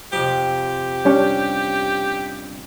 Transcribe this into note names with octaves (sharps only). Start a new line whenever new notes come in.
F2 C3 G4
G3 C#4 D4